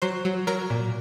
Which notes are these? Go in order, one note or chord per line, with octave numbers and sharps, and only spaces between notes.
F#3 C5 C6
F#3
F#3 A#4 A#5
A#2